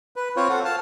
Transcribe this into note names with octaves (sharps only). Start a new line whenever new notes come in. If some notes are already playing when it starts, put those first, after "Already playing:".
B4
C4 F4 C5 C#5
A4 F#5
F5 A5